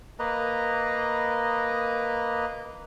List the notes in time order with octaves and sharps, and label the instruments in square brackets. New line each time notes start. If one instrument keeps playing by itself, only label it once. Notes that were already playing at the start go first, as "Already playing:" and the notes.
[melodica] A#3 B4 D#5 A#5